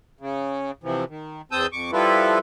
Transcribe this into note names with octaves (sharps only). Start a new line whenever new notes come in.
C#3
C3 E3 F3
D#3
E2 C4 A5 D#6 E6 G6
F2 C#6 D6
F3 G3 E4 F4 A4 B4